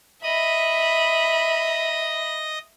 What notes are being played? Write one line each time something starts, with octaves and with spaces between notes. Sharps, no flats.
D#5 E5 B5 D#6